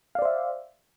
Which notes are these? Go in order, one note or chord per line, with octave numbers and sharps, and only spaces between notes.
C5 D5 E5 F5